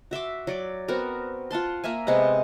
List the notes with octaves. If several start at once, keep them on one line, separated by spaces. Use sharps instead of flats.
F#4 E5 C6 D6
F#3 D5 D6
B3 C4 F#4 A#4
F4 F#5 A5 C6
A#3 A#4 E5 G#5
C3 G#3 B3 F#5